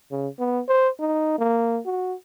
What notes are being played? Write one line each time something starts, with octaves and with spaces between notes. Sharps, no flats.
C#3
B3
C5
D#4
A#3
F#4